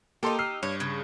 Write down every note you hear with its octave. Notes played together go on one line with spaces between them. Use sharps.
A#3 D#4 G4 A4 C6
E6 F6 C7
G2 C#5
C#3